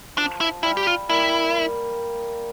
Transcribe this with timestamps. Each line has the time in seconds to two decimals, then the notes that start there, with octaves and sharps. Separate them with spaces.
0.18 F3 D4
0.41 E4
0.63 G3 E4
0.77 G4
0.87 F4
1.09 G3 A#3 E4